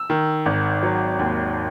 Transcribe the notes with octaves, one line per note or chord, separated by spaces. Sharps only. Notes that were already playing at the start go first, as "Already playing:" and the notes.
Already playing: E6
D#3
G#1
F#3
D#2